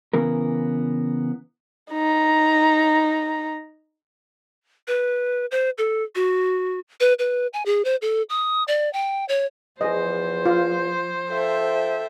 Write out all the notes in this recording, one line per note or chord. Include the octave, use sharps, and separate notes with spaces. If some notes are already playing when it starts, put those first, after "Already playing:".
C#3 E3 B3 A#4
D#4 A#5
B4
C5
A4
F#4
B4
B4
G#5
G#4
C5
A4
D#6
D5
G5
C#5
E2 F3 G#4 C5 D#5
F4
F3 A4 E5 G5